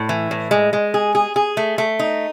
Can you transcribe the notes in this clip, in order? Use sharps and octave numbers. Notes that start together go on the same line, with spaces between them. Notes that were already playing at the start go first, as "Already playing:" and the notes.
Already playing: A2
E3
A2
G#3
G#3
G#4
G#4
G#4
A3
A3
D#4